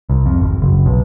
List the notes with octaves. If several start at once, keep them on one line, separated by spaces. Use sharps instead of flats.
C2
F2
G#1
F#1
B1